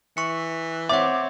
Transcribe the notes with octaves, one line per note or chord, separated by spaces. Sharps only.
E3 C#6 C#7
C4 C#5 E5 F#5 D6